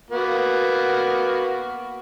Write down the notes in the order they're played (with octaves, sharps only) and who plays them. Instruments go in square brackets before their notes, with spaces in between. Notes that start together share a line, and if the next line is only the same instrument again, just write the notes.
[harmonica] A#3 B3 F#4